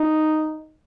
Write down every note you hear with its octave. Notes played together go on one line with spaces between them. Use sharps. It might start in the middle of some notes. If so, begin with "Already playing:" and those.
Already playing: D#4